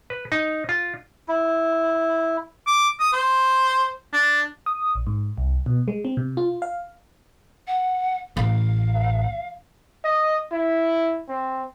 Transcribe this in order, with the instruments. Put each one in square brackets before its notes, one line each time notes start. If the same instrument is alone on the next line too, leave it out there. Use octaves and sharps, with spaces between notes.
[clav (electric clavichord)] B4
D#4
F4
[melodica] E4
[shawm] D6
D#6
C5
D4
[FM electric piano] D#6
A#1
G#2
C2
B2
G#3
C4
C3
F4
F5
[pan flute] F#5
[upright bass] A1 [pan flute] F5
[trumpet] D#5
E4
C4